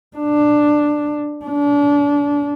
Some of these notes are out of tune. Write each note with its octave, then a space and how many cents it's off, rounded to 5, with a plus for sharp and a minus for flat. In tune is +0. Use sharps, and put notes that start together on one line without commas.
D4 +10
D4 -30